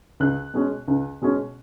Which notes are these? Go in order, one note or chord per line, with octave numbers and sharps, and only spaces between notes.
C#2 F#6
B2 G#3 C#4
C#2
B2 G#3 C#4